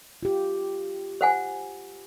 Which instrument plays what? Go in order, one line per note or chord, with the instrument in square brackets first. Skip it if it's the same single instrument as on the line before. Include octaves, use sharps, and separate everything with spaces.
[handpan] F4 G4
[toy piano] C5 F#5 G#5